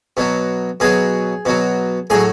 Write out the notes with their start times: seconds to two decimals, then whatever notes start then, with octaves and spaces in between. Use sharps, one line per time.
0.17 B2 F#3
0.80 B2 F#3 G#4
1.45 B2 F#3
2.10 A2 F#3 G#4